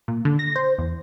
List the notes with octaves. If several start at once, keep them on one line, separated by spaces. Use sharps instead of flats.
A#2
D3
A#6
C5
E2